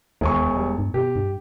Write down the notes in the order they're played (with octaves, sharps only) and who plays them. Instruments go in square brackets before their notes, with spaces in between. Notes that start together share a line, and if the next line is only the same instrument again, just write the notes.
[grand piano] E1 G#5 C#6 [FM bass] D#2
[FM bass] G3
G2
[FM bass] B2 [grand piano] G4
[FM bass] G2